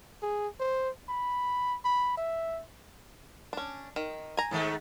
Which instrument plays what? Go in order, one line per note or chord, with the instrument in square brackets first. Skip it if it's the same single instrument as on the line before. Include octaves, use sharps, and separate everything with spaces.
[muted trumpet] G#4
C5
B5
B5
E5
[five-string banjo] C#4 D4
D#3
G#5 A#5
[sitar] G#2 D#3 A3